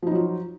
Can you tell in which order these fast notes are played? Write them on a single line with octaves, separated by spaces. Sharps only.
F3 D#4 F#3 F4